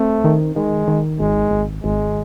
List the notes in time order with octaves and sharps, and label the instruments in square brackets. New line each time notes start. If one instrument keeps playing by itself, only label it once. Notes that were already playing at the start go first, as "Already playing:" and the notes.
Already playing: [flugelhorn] A3 [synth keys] C4
[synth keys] D#3
[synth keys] D#3 [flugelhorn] G#3
[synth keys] D#3
[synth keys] G#1 [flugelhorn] G#3
[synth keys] G#1
[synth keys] G#1 [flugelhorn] G#3